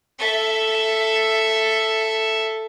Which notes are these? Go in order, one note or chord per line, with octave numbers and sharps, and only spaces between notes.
A4 E5